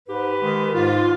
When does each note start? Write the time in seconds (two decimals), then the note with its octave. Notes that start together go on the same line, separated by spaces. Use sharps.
0.08 G#2 G4 B4
0.41 D#3 G#3
0.74 G#2 F4